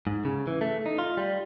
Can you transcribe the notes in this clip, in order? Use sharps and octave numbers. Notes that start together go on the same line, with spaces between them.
G#2
C#3
E3
A3
D#4
F4
G3